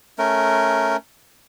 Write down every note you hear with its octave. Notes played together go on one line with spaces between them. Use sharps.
A3 C#4 A#4